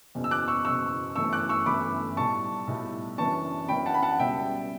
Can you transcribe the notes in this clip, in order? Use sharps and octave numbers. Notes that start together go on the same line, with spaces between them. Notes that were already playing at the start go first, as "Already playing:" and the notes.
F#1 E2 B2
E6
D6 F#6
C#6 E6
F#1 E2 B2 C#6 E6
G1 F#2 E3 A3 C#6 E6
D6 F#6
C#6 E6
G1 F#2 E3 A3 B5 D6
B1 A2 G3 A5 C#6
B1 A2 G3
F#2 E3 B3 D4 A5 C#6
F#2 E3 B3 D4 G5 B5
F#5 A5
B5
F#5 A5
C#2 B2 G3 E5 G5